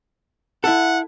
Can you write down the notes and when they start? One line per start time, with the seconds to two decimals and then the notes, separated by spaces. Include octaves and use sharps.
0.64 E4 A4 F#5